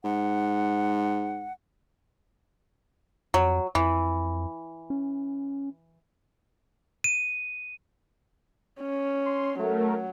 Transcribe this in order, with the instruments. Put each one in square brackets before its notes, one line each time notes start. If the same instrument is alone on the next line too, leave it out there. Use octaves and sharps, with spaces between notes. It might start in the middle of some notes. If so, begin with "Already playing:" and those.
[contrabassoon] G#2 [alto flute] F#5
[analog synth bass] F2 [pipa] F#3
[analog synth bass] F2 [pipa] E3
[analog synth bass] C#4
[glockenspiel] D#7
[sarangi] C#4
[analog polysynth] C6
[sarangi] F#3 [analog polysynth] A3 A#4